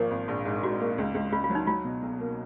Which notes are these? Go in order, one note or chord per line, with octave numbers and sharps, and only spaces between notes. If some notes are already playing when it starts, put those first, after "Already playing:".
Already playing: G#1 F3 A#3 A#4
G#1
A#1
G#2
G#2 F#4
A#3
C#2
C#2
C#2 F4
F4
F#3
D#4
F#3 F4
B2
B1
A#3